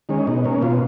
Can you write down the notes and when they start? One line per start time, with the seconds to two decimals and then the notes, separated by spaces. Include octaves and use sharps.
0.09 D#3 G#3 C#4
0.27 B2 D#4
0.44 A#3 C#4
0.62 B2 F4